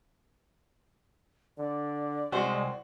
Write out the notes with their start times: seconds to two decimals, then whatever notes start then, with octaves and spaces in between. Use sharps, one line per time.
1.58 D3 D5
2.32 C2 G#3 F#4 C5 C6